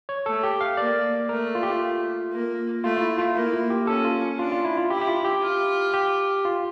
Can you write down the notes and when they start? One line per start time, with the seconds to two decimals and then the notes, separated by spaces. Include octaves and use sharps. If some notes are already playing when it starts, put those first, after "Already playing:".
0.09 C#5
0.26 A3 A4
0.43 G4
0.61 F5
0.77 A#3 D5
1.29 A3 A#4
1.55 F4
1.63 G4
1.70 F4
2.33 A#3
2.84 A3 F4
2.96 F4
3.01 E4
3.18 F4
3.35 A#3 E4
3.53 F4
3.70 G4
3.87 C#4 A4
4.05 F4
4.38 D4 F4
4.52 F4
4.64 E4
4.77 F4
4.90 E4 G4
5.01 G4
5.08 F4
5.25 G4
5.42 F4
5.93 G4
6.45 F4